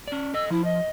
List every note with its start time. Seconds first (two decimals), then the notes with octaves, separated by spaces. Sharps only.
0.08 C#4 D5
0.34 A4 D#5 E6
0.50 F3 E4
0.64 D#5